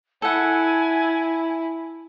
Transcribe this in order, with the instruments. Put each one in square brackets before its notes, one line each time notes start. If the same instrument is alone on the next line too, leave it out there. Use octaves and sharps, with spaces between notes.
[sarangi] E4 [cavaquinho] A4 F#5 [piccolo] G#5